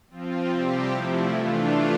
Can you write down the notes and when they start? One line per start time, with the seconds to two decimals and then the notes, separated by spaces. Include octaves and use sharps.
0.10 F3 C4 F4
0.50 C3 G3 C4 G4
0.90 C3 F3 A3 E4
1.30 E3 A3 D4 F4